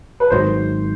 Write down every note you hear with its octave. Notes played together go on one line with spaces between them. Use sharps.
B4
G#1 G#2 D#3 F#3 C5